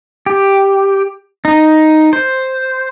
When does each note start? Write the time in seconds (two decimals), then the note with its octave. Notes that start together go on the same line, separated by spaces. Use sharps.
0.26 G4
1.45 D#4
2.13 C5